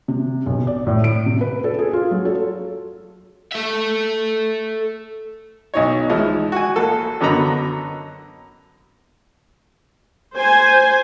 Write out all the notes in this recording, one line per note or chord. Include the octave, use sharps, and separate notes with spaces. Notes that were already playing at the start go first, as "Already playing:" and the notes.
C3
B1
D5
A2
D7
C3
B4
A4
G#4
F4
F#3
A4
A4 E5
B1 D#4 C#5
E3 F3 G#3 D#4 E4
F#4 G#5
A#1 A4
F#2 D3 B3 D#5 A#5 B5
C5 G#5